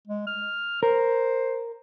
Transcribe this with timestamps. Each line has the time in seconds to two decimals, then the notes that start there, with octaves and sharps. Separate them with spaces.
0.07 G#3
0.27 F6
0.83 A#4 C5